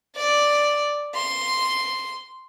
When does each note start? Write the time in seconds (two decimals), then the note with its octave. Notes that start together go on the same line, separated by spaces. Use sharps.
0.17 D5
1.15 C6